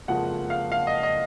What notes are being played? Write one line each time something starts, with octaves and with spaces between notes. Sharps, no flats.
F#1 F2 F3 G#3 F#5
F5
F5
D#5
D#5